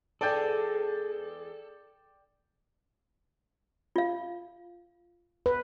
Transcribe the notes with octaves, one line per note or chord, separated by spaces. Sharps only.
E2 G#3 G#4 A4 D5 G5 G6
F4 F5
B4